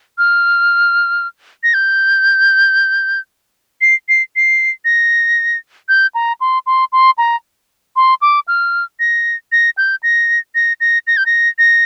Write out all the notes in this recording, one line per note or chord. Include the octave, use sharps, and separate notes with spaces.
F6
A#6
G6
C7
C7
C7
A#6
G6
A#5
C6
C6
C6
A#5
C6
D6
F6
A#6
A#6
G6
A#6
A#6
A#6
A#6
G6
A#6
A#6